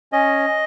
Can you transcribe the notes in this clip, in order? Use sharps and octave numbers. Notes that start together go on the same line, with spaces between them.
C#4 D#5